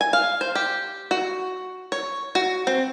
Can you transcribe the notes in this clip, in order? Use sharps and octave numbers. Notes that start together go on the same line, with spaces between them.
G#5
F5
C5
G4
F#4
C#5
F#4
C4